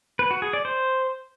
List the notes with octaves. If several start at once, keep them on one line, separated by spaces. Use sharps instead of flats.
B4
F#4
G#4
D5
C5